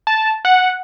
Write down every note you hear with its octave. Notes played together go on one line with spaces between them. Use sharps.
A5
F#5